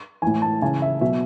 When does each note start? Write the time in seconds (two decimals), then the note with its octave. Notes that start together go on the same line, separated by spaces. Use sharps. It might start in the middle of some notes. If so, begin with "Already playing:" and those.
0.22 A2 E3 G#5
0.42 A5
0.62 C#3 E3 G#5
0.82 E5
1.01 B2 F#3 E5